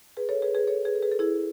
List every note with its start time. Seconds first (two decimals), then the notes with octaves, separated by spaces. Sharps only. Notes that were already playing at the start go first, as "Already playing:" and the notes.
0.17 G#4 B4
0.29 A4 C#5
0.42 G#4 B4
0.55 G#4 B4
0.68 A4 C#5
0.85 G#4 B4
0.95 A4
1.02 G#4 B4
1.12 A4
1.19 E4 G#4